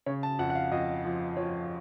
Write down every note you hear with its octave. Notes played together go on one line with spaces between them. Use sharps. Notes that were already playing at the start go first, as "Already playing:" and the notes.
C#3 C#5
A5
F2 F#5
F#5
F5
F2 D#5
F3
F3 C#5